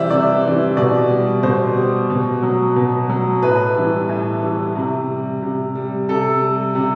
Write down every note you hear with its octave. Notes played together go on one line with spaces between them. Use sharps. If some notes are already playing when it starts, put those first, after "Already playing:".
Already playing: C3 E3 G3 C5 D5 E5
C3 D5
E3 G3
B2 D5
G3
B2 C5
G3
B2
F#3
B2
F#3
A2 B4
E3 G3
A2
E3 G3
C3
G3
C3
G3
C3 A4
G3
C3